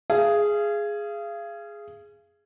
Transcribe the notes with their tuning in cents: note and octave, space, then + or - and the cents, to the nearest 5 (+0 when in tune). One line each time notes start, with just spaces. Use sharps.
G#4 +0 F5 -35